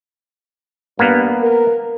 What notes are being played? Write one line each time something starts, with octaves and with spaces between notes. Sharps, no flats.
G2 A#3 B3
A#4